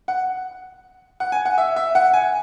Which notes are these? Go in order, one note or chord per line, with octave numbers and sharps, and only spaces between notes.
F#5
F#5
G#5
F#5
E5
E5
F#5
G#5